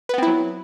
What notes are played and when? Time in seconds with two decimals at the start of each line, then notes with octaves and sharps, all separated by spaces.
0.09 B4
0.14 B3
0.18 C4
0.23 E4
0.27 F#3